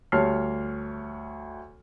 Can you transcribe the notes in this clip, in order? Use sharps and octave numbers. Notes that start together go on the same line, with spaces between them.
D2 G3 C#5 A5 F6 C7